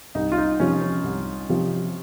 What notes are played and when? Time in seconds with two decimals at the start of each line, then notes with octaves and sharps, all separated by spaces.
0.15 C2 D#4
0.32 F4
0.38 D#4
0.60 C3 F3 C#4
0.82 C#4
1.04 C2
1.49 C3 F3